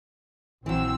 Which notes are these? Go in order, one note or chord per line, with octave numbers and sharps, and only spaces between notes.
A#1 E3 F#3 C4 E6